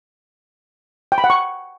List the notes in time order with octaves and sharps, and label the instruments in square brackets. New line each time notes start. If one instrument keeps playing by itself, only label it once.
[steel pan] G5
B5
F#5
C#6